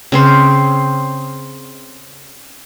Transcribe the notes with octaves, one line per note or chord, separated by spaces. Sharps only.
C#3 C4 C5